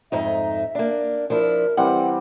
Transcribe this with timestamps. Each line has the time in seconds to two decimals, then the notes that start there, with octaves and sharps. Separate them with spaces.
0.12 F2 G#2 D#4 E5
0.75 A#3 D4
1.30 F3 D4 E4 A#4
1.77 E3 G3 C4 F#5